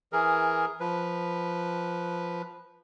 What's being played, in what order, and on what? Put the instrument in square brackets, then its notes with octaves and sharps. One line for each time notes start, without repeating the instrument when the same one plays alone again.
[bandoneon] E3 G#4 A#4
F3 B4